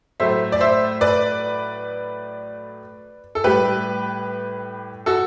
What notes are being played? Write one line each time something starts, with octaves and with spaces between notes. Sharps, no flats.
A2 F#3 A3 C5 E5
D5
C5 E5
B4 D5
A4
A2 G3 G4 B4
F#4 A4